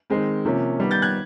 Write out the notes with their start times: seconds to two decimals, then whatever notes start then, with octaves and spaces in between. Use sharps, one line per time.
0.10 D#3 G#3 C4
0.45 C3 F3 A#3 C#4
0.79 D#3 G3 B3
0.91 G6 A6
1.02 F#6 G#6